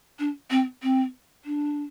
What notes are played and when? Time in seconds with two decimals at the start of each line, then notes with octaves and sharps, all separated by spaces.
0.19 D4
0.50 C4
0.83 C4
1.45 D4